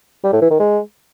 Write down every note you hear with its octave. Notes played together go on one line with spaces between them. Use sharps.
G3
A2
E3
D#3
G#3